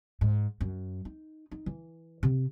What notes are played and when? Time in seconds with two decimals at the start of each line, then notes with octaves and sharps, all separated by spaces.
0.21 G#2
0.61 F#2
1.05 D#4
1.51 D#4
1.66 E3
2.23 C3